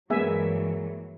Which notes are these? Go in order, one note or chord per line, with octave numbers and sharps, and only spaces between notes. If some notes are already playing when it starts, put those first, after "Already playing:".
G2 E3 F#3 G#3 A#3 B3 E5 G#5